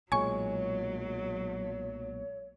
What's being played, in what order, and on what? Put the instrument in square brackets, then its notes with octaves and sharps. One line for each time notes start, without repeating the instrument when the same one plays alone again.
[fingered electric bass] B1 A#2 G#3 [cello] F#3 [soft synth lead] C#5 [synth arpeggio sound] G#5 C#6